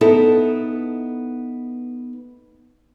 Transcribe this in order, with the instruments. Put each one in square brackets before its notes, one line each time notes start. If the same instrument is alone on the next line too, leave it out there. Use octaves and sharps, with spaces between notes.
[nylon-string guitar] B3 D#4 E4 A4